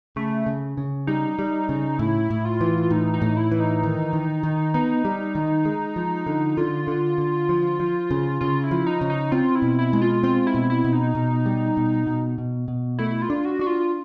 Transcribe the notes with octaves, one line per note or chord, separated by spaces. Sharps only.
C#3 A3
C#3
C#3
G3 D#4
G3
C#3
A2 E4
A2
F4
E3
A2 D#4
D#4
A2
E4
E3
D#4
D#3
D#3
D#3
B3 D#4
G3
D#3
G#3
F3
D3
D3 F4
D3
D3
F3
F3
C#3
C#3 F4
E4
F3
D#4
C#3
D#4
C4 F4
E4
B2
E4
G#3
F4
C4 F4
E4
B2
E4
B2
D#4
B2
G3
B2
B2
B2
B2
A3 E4
F4
D4
F#4
D4 F#4
F4